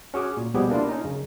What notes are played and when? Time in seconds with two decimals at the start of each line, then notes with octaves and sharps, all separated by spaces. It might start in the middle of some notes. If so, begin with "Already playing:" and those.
0.14 C#4 F#4 G#4 D6
0.37 A#2
0.54 B2 F3 G3 B3 G4 G#4
0.70 A#3 D4 E4 F4
0.89 C#4 D#4
1.04 F#2 C#3